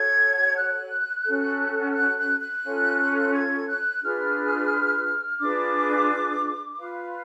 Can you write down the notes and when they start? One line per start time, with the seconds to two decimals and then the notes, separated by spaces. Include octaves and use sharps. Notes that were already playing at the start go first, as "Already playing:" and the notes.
Already playing: F#4 A4 C#5 G#6
0.56 F#6
1.25 C#4 F#4 A4
1.90 F6
1.95 F#6
2.17 F#6
2.40 F#6
2.63 C#4 F4 A4
3.33 G#6
3.67 F#6
4.02 D4 F4 G#4 B4 F6
5.40 D4 F4 G#4 B4 D6
6.78 F4 B4 F5